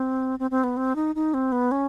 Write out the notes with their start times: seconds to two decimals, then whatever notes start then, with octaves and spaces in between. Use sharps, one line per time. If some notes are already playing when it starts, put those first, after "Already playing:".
Already playing: C4
0.39 C4
0.51 C4
0.64 B3
0.77 C4
0.96 D#4
1.15 D#4
1.34 C4
1.52 B3
1.72 C#4